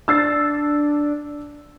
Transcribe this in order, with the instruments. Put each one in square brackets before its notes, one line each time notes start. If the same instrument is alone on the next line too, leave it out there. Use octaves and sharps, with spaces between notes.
[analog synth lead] D4 [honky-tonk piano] E6 A6 C7